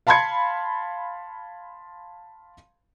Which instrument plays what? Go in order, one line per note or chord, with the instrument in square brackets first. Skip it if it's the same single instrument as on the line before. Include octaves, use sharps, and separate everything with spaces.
[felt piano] F5 A5 B5 C6 G#6 C#7